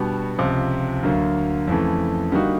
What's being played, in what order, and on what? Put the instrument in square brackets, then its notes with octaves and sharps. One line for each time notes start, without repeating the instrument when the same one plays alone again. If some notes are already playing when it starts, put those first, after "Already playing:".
Already playing: [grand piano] B2 G3 B3 D4 F#4
C#2 C3 F3
D2 D3 F#3 A#3
F2 C#3 E3 A3
D3 G3 A#3 D#4 F#4